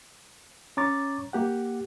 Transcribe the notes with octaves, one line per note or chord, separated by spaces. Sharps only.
C#4 C#5 A#5 C#6 D6 A6
A#3 G4 F#5